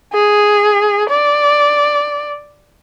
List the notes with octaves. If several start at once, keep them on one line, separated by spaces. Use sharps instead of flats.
G#4
D5